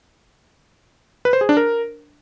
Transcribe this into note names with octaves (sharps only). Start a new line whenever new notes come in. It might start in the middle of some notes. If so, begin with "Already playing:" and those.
B4
C5
G#4
D4
A#4